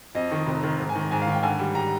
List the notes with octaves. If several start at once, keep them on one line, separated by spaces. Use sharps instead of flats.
F2 D#5
D#3
F1
D#3
G#2
G#5
D#3
A#5
G#2 G#5
F5
D#3
G5
D3 G#5
G3
G3 A#5